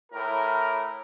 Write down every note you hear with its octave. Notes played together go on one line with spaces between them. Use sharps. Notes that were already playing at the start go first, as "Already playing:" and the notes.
A2 A#4